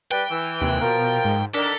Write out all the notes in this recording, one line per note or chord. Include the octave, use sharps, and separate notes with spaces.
G3 B4 G5
E3
D#2 C3 F#6
B2 F3 F4 A#4
G#2
D3 D#3 D4 A4 A#4 B6